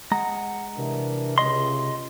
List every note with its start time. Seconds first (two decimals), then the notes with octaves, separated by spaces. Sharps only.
0.12 G#3 F#5 A#5
0.77 C3 E3 D4 A#4
1.38 C#2 D#5 C6